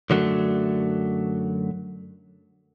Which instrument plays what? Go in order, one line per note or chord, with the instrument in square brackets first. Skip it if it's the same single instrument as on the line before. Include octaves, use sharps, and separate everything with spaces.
[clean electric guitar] F#2 D3 F#3 G3 A3